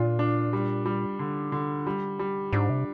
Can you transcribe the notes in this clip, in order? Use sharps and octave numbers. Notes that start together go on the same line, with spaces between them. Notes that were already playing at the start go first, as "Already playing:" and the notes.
Already playing: A#2 D4 F4
D4
G3
G3
D3
D3
G3
G3
G#2 D4
C3